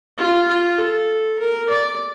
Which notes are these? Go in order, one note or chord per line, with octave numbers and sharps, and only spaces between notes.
F4
F4
A4
A#4
D5